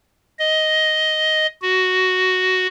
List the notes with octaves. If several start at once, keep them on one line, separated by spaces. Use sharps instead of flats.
D#5
F#4